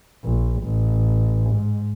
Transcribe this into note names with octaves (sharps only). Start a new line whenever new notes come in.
A#1
A1
G#2